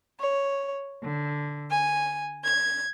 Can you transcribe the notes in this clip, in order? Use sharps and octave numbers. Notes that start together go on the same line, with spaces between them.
C#5
D3
G#5
G#6